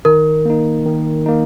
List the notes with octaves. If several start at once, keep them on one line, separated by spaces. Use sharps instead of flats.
D#3 A#4
A#3 D#4
D#3
A#3 D#4